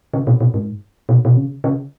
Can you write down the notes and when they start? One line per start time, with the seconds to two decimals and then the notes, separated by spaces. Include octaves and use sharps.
0.14 C#3
0.27 B2
0.41 B2
0.54 G#2
1.09 B2
1.25 B2
1.37 C#3
1.64 C#3